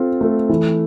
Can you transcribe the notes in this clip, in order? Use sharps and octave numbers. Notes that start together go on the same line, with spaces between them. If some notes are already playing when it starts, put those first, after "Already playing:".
Already playing: C4 F4 A4
A3
E3